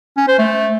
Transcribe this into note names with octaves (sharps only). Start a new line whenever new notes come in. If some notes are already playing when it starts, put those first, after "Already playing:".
C#4
C5
A3